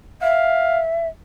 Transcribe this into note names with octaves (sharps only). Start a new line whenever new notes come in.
E5 F5